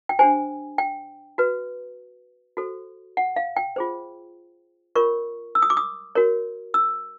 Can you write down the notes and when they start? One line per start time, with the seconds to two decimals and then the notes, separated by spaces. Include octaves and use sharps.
0.09 G5
0.19 D4 G4 C5 G#5
0.78 G5
1.38 F#4 B4
2.57 F#4 A4 C5
3.17 F#5
3.36 F5
3.56 G5
3.76 F4 G#4 C5
4.95 F4 A#4 C#5 C#6
5.55 E6
5.62 D#6
5.70 D6
5.77 D#6
6.15 F#4 A#4 C#5
6.74 E6